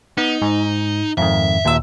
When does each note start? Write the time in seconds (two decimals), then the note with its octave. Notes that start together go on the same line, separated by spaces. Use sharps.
0.17 B3 D#4
0.42 G#2
1.18 F2 G#2 D#3 E5
1.65 D#2 A#2 E6